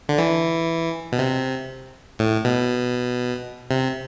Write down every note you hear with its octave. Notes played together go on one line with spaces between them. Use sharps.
D3
E3
B2
C3
A2
B2
C3